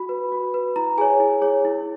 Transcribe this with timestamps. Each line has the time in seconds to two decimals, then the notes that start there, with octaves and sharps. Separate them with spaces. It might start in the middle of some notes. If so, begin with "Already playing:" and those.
Already playing: F#4 B5
0.09 B4
0.32 F#4
0.54 B4
0.76 E4 A#5
0.98 G#4 C#5 G#5
1.20 E4
1.42 G#4 C#5
1.65 E4